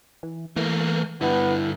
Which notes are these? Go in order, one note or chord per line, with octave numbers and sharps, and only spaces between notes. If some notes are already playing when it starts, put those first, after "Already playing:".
E3
E3 A3 A#3
G2 D3 B3 E4